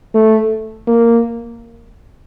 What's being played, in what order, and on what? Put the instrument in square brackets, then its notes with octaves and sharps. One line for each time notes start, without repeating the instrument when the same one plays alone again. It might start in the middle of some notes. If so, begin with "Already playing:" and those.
[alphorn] A3
A#3